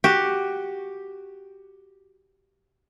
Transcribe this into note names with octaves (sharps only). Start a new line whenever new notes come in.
F#4 G4